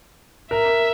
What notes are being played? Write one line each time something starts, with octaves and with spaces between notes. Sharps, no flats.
A#4 E5